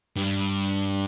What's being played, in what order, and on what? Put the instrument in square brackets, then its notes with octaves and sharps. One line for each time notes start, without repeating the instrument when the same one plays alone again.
[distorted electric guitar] G2